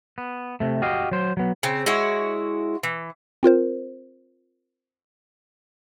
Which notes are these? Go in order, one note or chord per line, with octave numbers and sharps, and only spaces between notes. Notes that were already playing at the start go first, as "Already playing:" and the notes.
B3
C3 A3
F#4 G4 D#5 F5
F#3 C5
F#3 B3
C#3 C4
G#3 E4 F#4 C#5
E3
C4 F4 A#4 C5